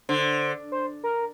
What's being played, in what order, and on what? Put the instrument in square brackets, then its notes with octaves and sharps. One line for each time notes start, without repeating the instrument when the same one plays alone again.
[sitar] D3 [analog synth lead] C5
[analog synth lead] C5
A#4